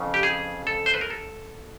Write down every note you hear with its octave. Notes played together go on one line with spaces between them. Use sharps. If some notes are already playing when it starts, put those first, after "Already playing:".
Already playing: F2 C#3 E3
G4
G#4
A4
C5
B4
A#4
A4